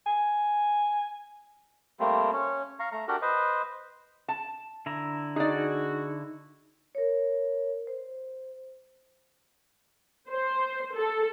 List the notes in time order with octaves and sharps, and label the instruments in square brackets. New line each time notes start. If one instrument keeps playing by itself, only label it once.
[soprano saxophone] G#5
[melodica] G3 A3 A#3 C4
C#4 C#5
F5 A#5 C#6
A3 A#5
D4 F#4 G4 A#4
B4 C5 D#5
[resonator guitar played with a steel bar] A5
[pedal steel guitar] D3 E4 A#5
[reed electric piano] D#4 [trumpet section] F#4 [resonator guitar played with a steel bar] G#4 D5
[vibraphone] A#4 C#5
C5
[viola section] C5
A4